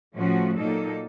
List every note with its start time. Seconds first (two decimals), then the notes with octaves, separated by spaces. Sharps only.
0.15 A2 F3 A3 C#4 F#4
0.56 A#2 F#3 A#3 D#4 A4